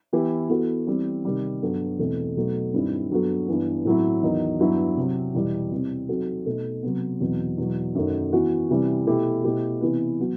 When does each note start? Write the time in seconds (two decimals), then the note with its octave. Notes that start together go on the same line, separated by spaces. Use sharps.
0.13 E3 B3 E4 G4
0.50 E3 B3 F#4 A4
0.87 E3 G3 C4
1.25 C3 D#3 G3
1.62 G2 F#3 B3 F#4 A4
1.99 E2 B2 A3 C4
2.36 B2 F#3 A3 D#4
2.74 G2 D#3 G3 C4 E4
3.10 G2 F#3 B3 F#4 A4
3.48 G2 E3 B3
3.85 A2 F#3 C4 E4
4.22 E2 D#3 F#3 B3 D#4
4.60 G2 F#3 B3 E4
4.97 C3 F#3 C4
5.35 E2 B2 G3 B3 E4
5.71 C3 E3 G3 C4
6.09 F#3 C4 D#4 F#4 A4
6.46 B2 A3 D#4 A4
6.83 C3 F#3 B3
7.20 E2 B2 F#3 C4
7.58 E2 B2 F#3
7.95 F#2 D#3 F#3 A3
8.33 E3 B3 F#4
8.70 C3 E3 G3
9.07 B2 A3 E4 G4
9.44 B2 A3 E4 G4
9.81 C3 E3 B3
10.19 F#3 B3 F#4